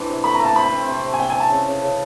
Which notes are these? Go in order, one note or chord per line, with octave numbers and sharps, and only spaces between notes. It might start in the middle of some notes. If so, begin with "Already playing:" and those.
Already playing: A2 E3 C4 D4
C3
A3 B5
A#5
A3
A5
C4 B5
C4
C3
C3
G#5
C3 G5
G#5
C3
A5
C#3
C#3
C#3